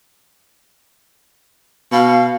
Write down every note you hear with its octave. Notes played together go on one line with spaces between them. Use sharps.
B2 F5